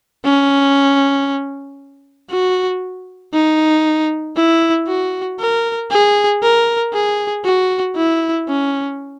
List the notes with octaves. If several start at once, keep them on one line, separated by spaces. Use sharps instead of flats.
C#4
F#4
D#4
E4
F#4
A#4
G#4
A#4
G#4
F#4
E4
C#4